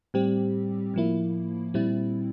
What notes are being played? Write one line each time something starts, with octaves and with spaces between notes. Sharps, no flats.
A2 G3 C4 G4
A2 F3 A#3 E4
A#2 G3 C4 E4